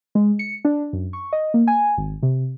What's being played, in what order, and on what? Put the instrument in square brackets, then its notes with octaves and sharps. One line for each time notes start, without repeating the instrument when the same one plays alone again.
[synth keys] G#3
C#7
D4
F#2
C#6
D#5
A#3
G#5
G#1
C3